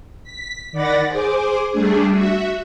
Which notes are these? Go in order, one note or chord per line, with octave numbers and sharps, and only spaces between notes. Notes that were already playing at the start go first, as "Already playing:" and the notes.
B6
D#3 D5 F#5 B5 A6 A#6
G#4 C5 D6
G3 A3 D4 G#4
F#4 E5